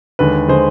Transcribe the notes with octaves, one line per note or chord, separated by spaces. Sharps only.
D#2 D3 G#3 B4
D3 G#3 C5